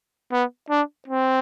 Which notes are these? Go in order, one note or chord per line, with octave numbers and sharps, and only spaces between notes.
B3
D4
C4